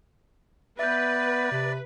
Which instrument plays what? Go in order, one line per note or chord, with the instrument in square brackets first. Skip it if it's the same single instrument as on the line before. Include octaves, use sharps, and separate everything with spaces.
[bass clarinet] B3 [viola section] B4 [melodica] D5 [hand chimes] E5 G6
[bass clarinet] C3